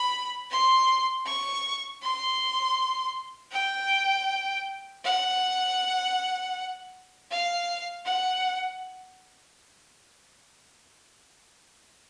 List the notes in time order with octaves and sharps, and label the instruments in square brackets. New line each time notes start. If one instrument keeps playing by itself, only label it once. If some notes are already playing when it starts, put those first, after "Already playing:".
Already playing: [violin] B5
C6
C#6
C6
G5
F#5
F5
F#5